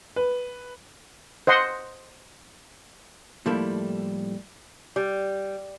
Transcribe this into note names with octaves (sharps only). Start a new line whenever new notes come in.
B4
C5 D#5 F#5 C6
A2 F3 G3 A3 A#3 E4
G3